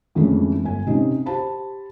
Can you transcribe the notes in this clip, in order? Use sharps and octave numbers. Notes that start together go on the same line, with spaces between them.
F2 D3 E3 G#3 A3 C#4
G1 G#5
C3 C#4 D#4 D#5
G4 C5 A5 B5